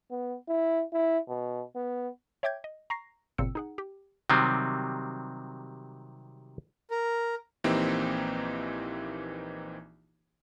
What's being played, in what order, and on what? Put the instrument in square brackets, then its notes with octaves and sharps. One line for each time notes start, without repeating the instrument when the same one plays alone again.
[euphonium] B3
E4
E4
B2
B3
[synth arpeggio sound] C#5 E5 G5 D6 G6 G#6
D#5
A#5 C#6 A#6 C7
G1 A#2 C#3 C4 E6 C#7
D#4 G#4 F#5
G4
[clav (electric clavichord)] C3 D#3 F#3 G3 C4
[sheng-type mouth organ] A#4
[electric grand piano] A#1 E3 A#3 C4 D#4 G4